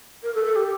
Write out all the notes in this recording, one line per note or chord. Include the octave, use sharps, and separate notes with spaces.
A#4
A4
A4
G4